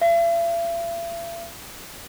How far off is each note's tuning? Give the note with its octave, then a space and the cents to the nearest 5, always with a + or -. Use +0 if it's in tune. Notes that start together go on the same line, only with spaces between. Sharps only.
E5 +45